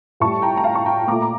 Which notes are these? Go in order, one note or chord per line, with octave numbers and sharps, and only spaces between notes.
A2 G3 A5 C#6
G5 A#5
A#5
F5 A5
C#6
G5 A#5
A#2 A3 A#5 D6
A#5